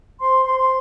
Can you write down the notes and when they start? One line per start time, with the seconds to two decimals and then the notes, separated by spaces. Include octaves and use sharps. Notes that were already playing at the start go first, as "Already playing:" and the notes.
0.20 C5 C6
0.46 C5 C6
0.59 C6